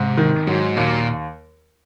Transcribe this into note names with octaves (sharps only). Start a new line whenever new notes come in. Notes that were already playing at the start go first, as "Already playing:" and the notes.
Already playing: G#2 C3
D#3
G#2 F#3
D#2 A#2